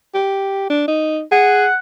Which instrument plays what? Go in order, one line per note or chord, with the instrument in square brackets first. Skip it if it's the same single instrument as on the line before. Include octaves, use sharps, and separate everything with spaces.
[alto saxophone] G4
D4
D#4
[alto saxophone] G#4 [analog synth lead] F#5